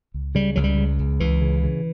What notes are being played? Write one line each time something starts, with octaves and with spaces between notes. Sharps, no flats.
C#2
C#3 G3
C#2 F#3
G3
C#3
C#2
C#2 E3
C#3
C#3